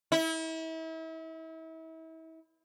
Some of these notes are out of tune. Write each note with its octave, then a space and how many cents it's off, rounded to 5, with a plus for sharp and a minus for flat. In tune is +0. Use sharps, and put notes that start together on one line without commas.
E4 -35